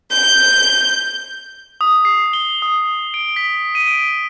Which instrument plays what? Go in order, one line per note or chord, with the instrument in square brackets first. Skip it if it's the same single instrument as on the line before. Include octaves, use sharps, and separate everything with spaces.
[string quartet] G6
[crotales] D#6
C7
G7
D#6
D7
B6
D#7
D7